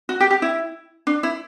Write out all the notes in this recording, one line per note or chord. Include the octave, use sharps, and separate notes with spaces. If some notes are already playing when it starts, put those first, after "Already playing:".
F#4
G4
G4
E4
D4
E4